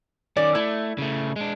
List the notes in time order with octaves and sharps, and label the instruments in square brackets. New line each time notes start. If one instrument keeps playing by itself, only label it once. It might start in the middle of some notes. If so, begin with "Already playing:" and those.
[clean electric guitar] D#3 C#4 [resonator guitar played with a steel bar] D5
[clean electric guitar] A3 [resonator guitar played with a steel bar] E4
[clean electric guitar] C#3 A3
G#3 D4